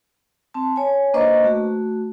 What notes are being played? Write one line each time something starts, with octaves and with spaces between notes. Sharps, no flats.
C4 A5
C#5 G#5
A#3 D4 B4 C5 D#5 C#6
A3 F#4